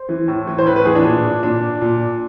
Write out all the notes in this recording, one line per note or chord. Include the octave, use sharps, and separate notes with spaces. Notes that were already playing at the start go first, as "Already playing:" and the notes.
Already playing: C5
E3
A2
E3
C5
A2 B4
B4
E3 G#4
D4
A#2
A#2 D4
A#2